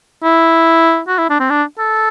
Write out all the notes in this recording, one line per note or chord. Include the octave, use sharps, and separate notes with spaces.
E4
F#4
E4
D4
C4
D4
A4